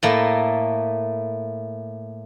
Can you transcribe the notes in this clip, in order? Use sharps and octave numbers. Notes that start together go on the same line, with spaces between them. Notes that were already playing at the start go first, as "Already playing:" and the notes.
A2 A3 A#3